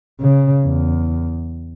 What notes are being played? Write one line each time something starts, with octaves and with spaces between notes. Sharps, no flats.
C#3
E2